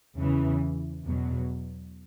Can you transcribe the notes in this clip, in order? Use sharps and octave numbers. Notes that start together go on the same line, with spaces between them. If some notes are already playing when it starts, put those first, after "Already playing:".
E2 C#3 E3
E2 B2 F#3